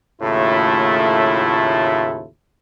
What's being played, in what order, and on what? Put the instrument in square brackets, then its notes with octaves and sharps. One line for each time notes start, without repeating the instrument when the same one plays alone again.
[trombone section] D#2 A2 C#3 A3 E4 F4